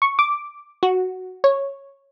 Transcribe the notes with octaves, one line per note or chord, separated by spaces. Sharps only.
C#6
D6
F#4
C#5